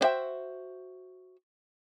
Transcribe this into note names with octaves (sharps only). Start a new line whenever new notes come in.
D4 F#4 C5 E5 G5